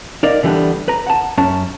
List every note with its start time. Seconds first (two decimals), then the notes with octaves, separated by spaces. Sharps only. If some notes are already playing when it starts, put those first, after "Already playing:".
0.23 D#4 A#4 D5 F5
0.43 D3 E3 G3 B3 D4
0.88 B4 A#5
1.06 F#5 A5
1.37 F#2 C#4 A5